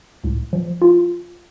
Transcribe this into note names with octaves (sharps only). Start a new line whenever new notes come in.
C#2 A2
F3
F4